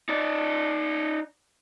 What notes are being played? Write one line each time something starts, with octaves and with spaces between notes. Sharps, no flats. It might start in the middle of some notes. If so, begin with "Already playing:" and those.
D#4 D5